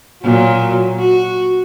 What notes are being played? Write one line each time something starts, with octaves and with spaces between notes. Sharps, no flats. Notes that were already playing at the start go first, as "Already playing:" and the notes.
A#2 F#3
F#4